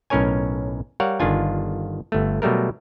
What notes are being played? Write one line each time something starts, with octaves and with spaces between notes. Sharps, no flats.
B1 A2 C#4 A#4 C#5 G#5
G3 A#4 C#5 F5 F#5
G1 D#3 D4 F4 G#5
G1 A3
B2 F#3 G3 A3 A#4